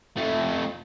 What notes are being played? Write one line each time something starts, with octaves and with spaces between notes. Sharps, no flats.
F2 A3